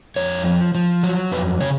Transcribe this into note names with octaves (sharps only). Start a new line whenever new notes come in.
F2 C#5
F3
F3
F#3
F2 B4
C#3 C#5